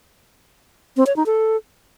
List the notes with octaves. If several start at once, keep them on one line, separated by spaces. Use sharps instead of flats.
C4
C#5
D#4
A4